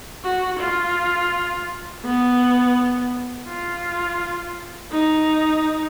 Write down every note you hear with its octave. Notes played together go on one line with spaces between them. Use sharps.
F#4
F4
B3
F4
D#4